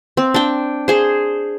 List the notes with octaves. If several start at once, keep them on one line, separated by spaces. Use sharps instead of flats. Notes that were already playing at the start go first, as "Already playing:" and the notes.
C4
D4 G5
G#4 C5